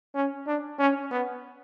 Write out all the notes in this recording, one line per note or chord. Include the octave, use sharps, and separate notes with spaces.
C#4
D4
C#4
B3